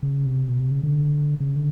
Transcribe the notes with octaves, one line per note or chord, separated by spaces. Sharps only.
C#3
C3
B2
C3
C#3
D3
C#3
D3